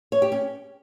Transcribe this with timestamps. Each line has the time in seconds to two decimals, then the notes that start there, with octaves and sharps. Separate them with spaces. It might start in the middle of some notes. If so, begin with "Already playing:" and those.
0.12 C#5
0.22 G4
0.32 C#4